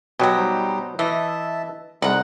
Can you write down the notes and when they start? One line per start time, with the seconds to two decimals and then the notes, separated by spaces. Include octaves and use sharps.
0.19 B2 F#3 G4 A#5
0.36 G3 D#4 C5
0.99 E3 D#5 E5 A5
2.02 C2 G#3 D#4 F#5 D#6